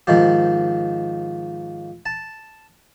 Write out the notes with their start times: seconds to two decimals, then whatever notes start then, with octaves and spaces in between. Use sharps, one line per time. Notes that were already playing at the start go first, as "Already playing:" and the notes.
0.07 G#2 D#3 F3 G4
2.06 A5